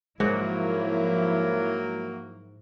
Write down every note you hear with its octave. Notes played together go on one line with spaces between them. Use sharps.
G#2 F3 F#3 G#3 A#3 E4 F#4